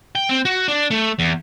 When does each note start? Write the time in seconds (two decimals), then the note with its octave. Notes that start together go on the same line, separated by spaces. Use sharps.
0.15 G5
0.29 C4
0.45 F#4
0.68 D4
0.91 A3
1.19 E2